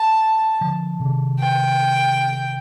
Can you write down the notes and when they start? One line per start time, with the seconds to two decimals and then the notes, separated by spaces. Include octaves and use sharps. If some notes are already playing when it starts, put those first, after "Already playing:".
Already playing: A5
0.61 D3 F3
1.00 C3 D#3
1.40 G5